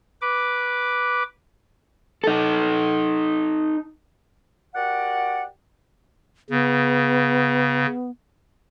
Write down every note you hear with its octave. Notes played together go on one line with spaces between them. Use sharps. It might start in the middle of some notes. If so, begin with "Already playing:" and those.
B4 D6
D#4 A4
F#4 G4 A#4 D5 F#5
C#3 B3